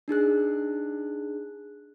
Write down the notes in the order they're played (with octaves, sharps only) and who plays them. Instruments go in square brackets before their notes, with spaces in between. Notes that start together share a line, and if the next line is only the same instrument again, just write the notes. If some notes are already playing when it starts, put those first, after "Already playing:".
[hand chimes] D4 D#4 G#4 F#6